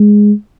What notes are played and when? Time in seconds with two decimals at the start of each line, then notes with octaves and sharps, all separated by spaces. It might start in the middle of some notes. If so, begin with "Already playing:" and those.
Already playing: G#3